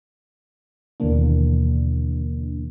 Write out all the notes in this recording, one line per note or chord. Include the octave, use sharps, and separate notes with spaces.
D#2 B2 D3 E3 A#3 D4